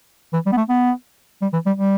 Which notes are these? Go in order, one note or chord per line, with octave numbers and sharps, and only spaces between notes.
E3
G3
B3
A3
B3
G3
E3
G3
G3